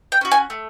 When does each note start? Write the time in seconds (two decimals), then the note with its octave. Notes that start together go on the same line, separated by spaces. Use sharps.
0.12 G5
0.21 C#4 F#4
0.32 G#5
0.50 A3